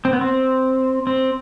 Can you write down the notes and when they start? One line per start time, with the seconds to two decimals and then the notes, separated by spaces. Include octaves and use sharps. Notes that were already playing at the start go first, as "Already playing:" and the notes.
0.05 C4
0.13 B3
0.21 C4
1.07 C4